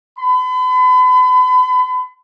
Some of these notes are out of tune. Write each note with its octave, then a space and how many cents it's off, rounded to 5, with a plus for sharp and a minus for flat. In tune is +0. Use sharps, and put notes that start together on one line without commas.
B5 +40